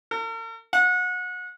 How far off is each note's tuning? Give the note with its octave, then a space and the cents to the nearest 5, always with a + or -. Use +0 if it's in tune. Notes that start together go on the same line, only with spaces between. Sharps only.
A#4 -45
F#5 -30